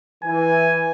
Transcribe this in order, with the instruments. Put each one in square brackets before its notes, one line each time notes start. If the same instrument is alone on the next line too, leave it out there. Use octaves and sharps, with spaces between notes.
[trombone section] E3 [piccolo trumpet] G#5